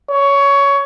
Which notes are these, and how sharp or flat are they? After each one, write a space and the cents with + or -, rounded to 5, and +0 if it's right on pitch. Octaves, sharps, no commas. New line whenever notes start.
C#5 +15